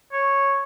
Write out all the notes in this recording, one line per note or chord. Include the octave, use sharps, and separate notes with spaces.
C#5